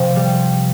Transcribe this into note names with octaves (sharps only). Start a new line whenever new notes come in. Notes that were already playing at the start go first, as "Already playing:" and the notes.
Already playing: C3 F3
G3